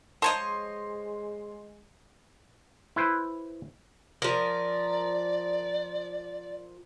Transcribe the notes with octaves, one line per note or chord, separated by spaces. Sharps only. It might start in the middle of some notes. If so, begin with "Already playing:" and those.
F3 G#3 C5 C#5 D#5 A5 A#5 C6
E4 B4 C5
F3 A#4 D5